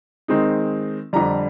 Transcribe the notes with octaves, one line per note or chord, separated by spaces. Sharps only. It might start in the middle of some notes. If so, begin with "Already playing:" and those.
D#3 G#3 C4 D#4
F2 D3 G3 A#5